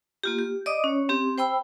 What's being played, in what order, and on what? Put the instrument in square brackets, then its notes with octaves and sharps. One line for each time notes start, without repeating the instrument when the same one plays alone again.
[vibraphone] A#3 F4 G4
G4
D5 D#5 D6 D#6
C#4 C#5
C4 G4
C5 G5 B5 E6